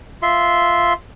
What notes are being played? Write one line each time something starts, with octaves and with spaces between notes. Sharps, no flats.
F4 E5 C6